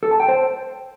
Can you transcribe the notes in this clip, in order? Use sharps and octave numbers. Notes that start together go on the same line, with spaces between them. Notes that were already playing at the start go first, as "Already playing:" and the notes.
A4
A5
G5
C5